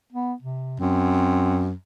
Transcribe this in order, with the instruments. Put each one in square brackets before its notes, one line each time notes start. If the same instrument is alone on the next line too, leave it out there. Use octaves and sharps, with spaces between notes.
[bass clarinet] B3
C3
[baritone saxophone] F#2 [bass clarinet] C4